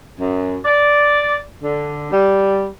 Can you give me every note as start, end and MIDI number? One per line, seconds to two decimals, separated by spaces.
0.18 0.58 42
0.65 1.38 74
1.61 2.10 50
2.11 2.67 55